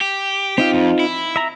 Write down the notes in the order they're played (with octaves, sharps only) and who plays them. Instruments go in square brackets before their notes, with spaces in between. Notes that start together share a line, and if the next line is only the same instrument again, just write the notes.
[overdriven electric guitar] G4
[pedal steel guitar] C4 D#4 F4 [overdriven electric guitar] G4
[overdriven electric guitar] F2
E4
[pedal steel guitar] E5 A#5